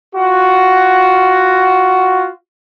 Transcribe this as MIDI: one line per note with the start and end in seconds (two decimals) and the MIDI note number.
0.15 2.31 65
0.15 2.31 66